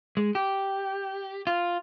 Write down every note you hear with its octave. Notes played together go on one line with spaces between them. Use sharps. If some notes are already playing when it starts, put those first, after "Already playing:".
G#3
G4
F4